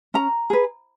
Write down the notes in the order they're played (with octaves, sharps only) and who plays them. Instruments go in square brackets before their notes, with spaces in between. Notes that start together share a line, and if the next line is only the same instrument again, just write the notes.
[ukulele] C#4 A#5
G#4 B4